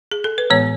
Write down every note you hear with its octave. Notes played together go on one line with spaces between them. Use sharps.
G#4
A4
B4
A2 E3 G#3 B3 C#5